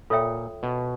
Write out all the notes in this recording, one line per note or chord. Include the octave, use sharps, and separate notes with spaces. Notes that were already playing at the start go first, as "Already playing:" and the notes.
A#2 F4 A4 C#5 E5 G5
B2